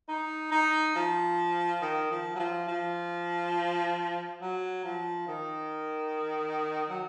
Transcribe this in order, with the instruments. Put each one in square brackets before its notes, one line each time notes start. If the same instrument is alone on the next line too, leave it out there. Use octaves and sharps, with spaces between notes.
[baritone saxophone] D#4
D#4
F3
D#3
F3
F#3
F3
F3
F#3
F3
D#3
F#3